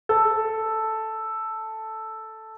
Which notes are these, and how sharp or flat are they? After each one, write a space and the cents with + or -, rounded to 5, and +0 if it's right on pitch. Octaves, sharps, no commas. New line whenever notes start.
A4 +0